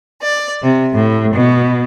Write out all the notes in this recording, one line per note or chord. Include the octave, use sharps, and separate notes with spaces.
D5
C3
A2
B2